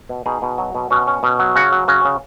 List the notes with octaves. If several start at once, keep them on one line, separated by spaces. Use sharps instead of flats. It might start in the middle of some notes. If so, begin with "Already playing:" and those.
B2
B2 D#4 G#4
B2
F#3
B2
B2 C#4 F#4
C#4
B2
F#3
C#3 C#4 F#4
F#3
C#3 C#4 F#4
C#3